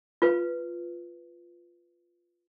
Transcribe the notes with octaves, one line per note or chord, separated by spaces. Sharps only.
F4 B4